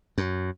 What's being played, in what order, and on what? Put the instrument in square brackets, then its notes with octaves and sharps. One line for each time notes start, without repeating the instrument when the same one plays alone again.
[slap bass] F#2